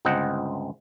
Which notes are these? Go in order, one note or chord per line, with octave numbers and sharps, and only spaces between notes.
G1 C#2 C4 D#5 F#5